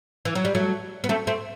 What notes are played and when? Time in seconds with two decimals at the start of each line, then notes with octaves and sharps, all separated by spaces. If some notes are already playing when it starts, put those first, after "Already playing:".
0.25 E3
0.35 F#3
0.45 G3
0.55 F#3 A3
1.04 B3
1.09 A3 C4
1.27 A3 C4